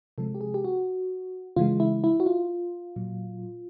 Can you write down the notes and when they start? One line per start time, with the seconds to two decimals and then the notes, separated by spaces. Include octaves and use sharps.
0.18 C3 F3 G#3 A4
0.35 G4
0.41 G#4
0.54 G4
0.65 F#4
1.56 C#3 E3 G#3 F4
1.80 E4
2.04 E4
2.20 F#4
2.26 F4
2.96 A#2 F#3